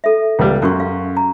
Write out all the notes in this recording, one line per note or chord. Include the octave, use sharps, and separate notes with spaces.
A4 E5
C#2 G3
F#2 C#4 F#4 C#6
F5
A#5